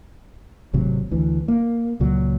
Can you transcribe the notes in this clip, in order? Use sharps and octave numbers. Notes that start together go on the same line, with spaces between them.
G#1 A2 C3 F#3
D2 E3
A#3
C#2 A#2 F#3